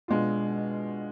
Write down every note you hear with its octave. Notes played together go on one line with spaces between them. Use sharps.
B2 G#3 D4 F4